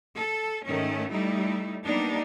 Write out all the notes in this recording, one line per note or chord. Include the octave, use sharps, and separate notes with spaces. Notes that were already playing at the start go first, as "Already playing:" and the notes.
A4
G#2 D#3 A3 C#4
G3 A3 D#4 E4
G3 A#3 B3 D4 D#4